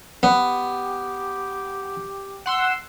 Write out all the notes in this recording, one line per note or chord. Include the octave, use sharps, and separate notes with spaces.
B3 G4
F#5 C6 E6